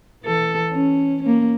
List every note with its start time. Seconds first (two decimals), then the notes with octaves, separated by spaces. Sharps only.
0.24 E3 A4
0.72 C#4
1.23 A#3 C#4